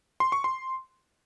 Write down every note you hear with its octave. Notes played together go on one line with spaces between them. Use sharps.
C6
C#6
C6